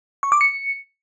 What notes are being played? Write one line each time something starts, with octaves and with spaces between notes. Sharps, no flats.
C#6
D6
C#7